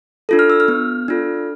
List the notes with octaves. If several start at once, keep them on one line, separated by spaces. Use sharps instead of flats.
D4 F4 A4
F6
E6
F6
B3
D4 F4 A4